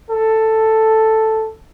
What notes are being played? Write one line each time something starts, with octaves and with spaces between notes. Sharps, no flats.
A4